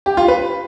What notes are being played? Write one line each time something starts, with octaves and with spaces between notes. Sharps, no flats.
G4
F4
B4